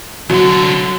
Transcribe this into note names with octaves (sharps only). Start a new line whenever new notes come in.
C2 D3 F#3